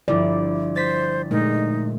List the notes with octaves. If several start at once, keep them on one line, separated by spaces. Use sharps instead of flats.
G1 F3 G3 E4 D5
C5 A6 B6
A#2 G#3 A3 D#4